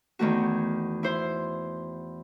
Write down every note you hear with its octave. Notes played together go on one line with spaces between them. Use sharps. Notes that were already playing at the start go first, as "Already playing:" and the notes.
E2 D#3 A3 F#4
E4 C5 C6